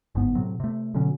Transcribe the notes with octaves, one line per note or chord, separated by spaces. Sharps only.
G1 G#2 B3
A2 C3 F#3
C3 A3
B2 D3 F#3 C#4